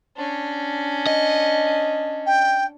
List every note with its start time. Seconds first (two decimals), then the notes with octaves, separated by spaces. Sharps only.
0.17 C#4 D4
1.07 D#5
2.26 G5